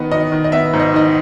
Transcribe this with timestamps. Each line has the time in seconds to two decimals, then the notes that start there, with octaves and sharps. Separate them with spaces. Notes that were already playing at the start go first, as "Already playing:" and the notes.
Already playing: D#3 B3 D#5
0.12 D#3 D#5
0.32 D#3
0.44 D#5
0.52 B3 E5
0.73 G#2
0.80 D#5
0.94 D#3 D#5